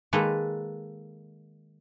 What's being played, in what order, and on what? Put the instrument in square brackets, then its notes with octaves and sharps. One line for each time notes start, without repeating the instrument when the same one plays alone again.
[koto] D#3 G#3 A#3 A4 B4